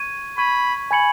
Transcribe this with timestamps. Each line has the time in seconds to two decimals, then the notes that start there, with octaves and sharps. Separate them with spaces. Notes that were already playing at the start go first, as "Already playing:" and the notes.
Already playing: C#6 G#6 D#7
0.38 B5 C#6 G#6 D#7
0.91 G#5 B5 G#6 C#7 F#7